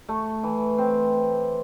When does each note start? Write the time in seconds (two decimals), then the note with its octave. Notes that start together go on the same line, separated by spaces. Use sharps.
0.09 A3
0.43 E3
0.78 C4